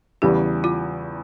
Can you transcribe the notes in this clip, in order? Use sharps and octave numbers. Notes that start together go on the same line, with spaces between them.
E2 C#3 E3 G3 G4
F4